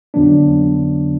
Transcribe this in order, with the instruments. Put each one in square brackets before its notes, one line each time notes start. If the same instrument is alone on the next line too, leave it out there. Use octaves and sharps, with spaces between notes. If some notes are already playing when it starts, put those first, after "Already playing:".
[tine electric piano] F2 D3 F#3 B3 D4